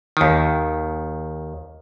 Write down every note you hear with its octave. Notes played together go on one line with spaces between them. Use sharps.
D#2 D#3